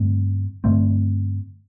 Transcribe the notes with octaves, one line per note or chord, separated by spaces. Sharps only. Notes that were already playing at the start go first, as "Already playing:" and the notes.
Already playing: G2 D3 A3 C4
G2 D3 A3 C4